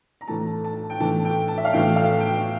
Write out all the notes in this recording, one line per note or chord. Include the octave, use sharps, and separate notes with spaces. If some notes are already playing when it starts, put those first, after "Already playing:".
A#5
A2 E3 A3 A5
A5
G5
A2 E3 A3 A5
G5
A5
E5
F5
A2 E3 A3 G5
F5
G5